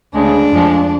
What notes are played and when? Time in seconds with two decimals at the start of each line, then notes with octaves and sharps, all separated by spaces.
0.13 D2 C#3 G#3 D4
0.52 F2 F3 G#3